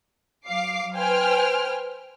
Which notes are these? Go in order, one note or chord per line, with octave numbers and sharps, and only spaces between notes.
F#3 F5 D6 C7
B4 C5 G5 G#5 F6